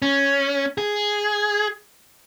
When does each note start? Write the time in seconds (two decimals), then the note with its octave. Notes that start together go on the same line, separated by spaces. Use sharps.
0.02 C#4
0.78 G#4